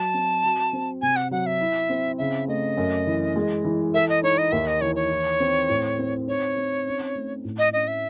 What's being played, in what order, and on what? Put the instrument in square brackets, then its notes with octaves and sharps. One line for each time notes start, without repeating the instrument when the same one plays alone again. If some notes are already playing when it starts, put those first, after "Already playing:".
Already playing: [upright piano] F#3 F#4 [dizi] A5
[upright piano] C4
F#4
C4
[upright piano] C3 [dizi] G#5
[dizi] F#5
[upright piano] F#3 [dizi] F#5
[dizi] E5
[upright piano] E4
C4
[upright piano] C#3 [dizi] E5
[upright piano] A3 [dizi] D#5
[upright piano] F#2
E3
G#3
E3
[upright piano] A4 [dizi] E5
[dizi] D#5
[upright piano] D#4 [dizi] C#5
[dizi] D#5
[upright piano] D#2 [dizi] E5
[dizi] D#5
[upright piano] E3 [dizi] C#5
[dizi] C#5
[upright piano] E4
C4
A2
C4
[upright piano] D#4 [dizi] C#5
[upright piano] C4
C#4
A3
A2
[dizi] D#5
[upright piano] C#4 [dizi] D#5
[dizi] E5